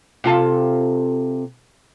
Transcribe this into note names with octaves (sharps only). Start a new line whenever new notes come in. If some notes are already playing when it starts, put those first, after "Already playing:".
C3 F4 A4